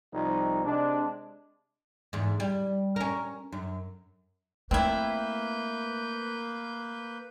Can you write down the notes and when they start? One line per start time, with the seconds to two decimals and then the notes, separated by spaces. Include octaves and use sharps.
0.13 C2 F3 D#4
0.65 C3 G#3 D4
2.13 E2 G#2
2.40 G3
2.96 C#4 A#4
3.52 F#2
4.71 A3 A#3 C4 E4 B4 G6